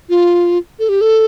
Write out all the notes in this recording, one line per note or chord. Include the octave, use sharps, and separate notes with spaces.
F4
A4
G4
A4